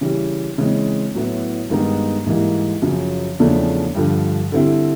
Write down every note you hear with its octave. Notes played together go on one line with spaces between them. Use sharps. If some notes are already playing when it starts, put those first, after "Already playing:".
C#3 E3 G3
C#3 E3 G#3 C4
A2 F#3 B3 E4
G2 D#3 G#3 B3 D#4
G#2 E3 G3 A#3
F#2 C#3 F3
E2 C#3 F3 A3 D4
G2 D3 F3
D3 G3 C4 E4